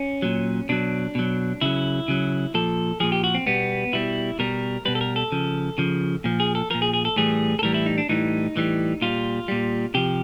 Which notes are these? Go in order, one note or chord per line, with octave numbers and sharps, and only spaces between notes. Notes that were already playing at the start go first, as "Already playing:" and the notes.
Already playing: C#4
A#2 F#3
B2 F#3 D4
B2 F#3
C#3 F#3 E4
C#3 F#3
A#2 F3 A4
A#2 F3 G#4
G4
F#4
C4
B2 G3 B3
B2 G3 E4
B2 G3 A#4
B2 G3 B4
A4
A#4
A4
C#3 F3
C#3 F3
A#2 F3
G#4
A4
A#2 F3 A#4
G#4
G#4
A4
A2 E3 G3 G#4
A4
A2 E3 G3 A#4
E4
D#4
D4
A2 E3 G3 D#4
A2 E3 G3
A#2 G3 F4
A#2 G3
C3 F3 G4